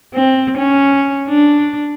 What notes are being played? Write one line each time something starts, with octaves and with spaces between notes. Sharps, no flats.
C4
C#4
D4